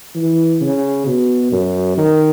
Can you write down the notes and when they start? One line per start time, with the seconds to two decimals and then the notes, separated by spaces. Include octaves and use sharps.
0.15 E3
0.61 C#3
1.06 B2
1.52 F#2
1.98 D#3